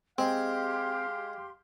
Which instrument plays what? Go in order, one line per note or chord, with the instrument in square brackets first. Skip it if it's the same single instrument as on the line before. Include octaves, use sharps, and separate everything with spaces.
[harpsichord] G#3 [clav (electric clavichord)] C4 [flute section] G4 C6 [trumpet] F5